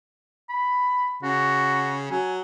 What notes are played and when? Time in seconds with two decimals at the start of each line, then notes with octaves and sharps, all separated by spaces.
0.49 B5
1.23 C#3 F#4
2.11 F#3 G#5